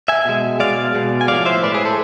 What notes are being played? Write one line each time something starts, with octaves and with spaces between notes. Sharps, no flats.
E5 G#5
B2 G#3
B2 G#3 D5 F5
B2 G#3
G#5
A2 F3 G#3 D5 F5
C5 E5
A2 F3 G#3 B4 D5
G#4 B4
A4 C5